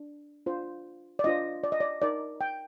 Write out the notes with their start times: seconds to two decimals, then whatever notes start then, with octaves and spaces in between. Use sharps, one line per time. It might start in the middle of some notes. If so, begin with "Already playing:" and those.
Already playing: D4
0.46 D4 F4 C5
1.19 D5
1.24 D4 F4 C5 D#5
1.64 D5
1.72 D#5
1.80 D5
2.02 D#4 A#4 D5
2.41 G5